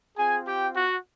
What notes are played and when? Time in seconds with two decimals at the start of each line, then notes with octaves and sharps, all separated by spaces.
0.17 C4 F4 G#4 G#5
0.46 G4 G5
0.75 F#4 F#5